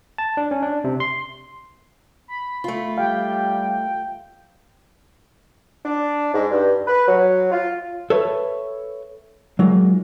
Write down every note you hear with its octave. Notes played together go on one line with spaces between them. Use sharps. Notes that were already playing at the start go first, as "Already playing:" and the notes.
A5
D4
C#4
D4
C3
C6
B5
A3 F4
G3 G4 F5 G5
D4
G#2
G2
B4
F#3
F4
A4 B4 C#5 E5
F#3 G#3 A#3 D#4 F4